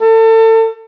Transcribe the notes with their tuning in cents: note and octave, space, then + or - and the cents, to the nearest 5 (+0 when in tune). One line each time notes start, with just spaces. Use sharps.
A4 +30